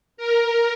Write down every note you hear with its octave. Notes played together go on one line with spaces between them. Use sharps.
A#4